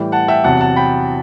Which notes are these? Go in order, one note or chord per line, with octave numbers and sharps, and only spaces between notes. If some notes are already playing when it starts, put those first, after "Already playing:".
Already playing: A2 E3 G3 G5
F#5 A5
E5 G5
E2 C3 F#3 F#5 A5
F#5 A5
G5 B5